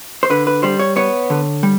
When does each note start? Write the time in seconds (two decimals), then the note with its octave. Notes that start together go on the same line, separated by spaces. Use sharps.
0.23 C5
0.30 D3 B4
0.47 B4
0.63 G3 C5
0.79 C#5
0.96 B3 C#5
1.30 D3
1.63 G3